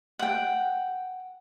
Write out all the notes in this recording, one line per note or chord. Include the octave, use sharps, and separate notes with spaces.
F#5 G5